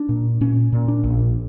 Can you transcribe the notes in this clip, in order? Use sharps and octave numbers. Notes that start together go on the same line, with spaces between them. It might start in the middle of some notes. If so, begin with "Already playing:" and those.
Already playing: D4
A#2
A#2 C#4
A#2
D4
A#1